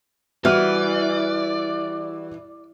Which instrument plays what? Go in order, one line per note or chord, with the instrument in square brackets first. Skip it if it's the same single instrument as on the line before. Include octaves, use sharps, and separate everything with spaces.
[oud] E3 [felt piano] G3 F#4 F6 [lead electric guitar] D5